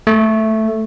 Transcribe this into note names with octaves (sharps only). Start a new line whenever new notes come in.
A3